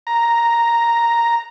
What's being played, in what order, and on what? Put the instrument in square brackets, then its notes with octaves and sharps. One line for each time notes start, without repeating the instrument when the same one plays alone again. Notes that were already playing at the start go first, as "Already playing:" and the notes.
[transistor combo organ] A#5